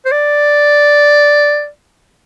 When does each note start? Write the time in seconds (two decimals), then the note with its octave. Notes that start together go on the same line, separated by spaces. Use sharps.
0.05 C5
0.12 D5